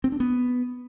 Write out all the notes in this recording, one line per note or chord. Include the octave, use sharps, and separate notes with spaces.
C4
D4
B3